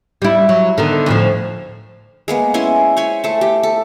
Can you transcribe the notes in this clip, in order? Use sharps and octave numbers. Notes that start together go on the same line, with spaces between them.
G3 E4
F#3
D3 D#3 B3
D2 A2 F3
G#3 A#3 B3
C#4 E4 G#5 C6
C5 C#5 G#5 B5
A3 C5 A5
G4
A4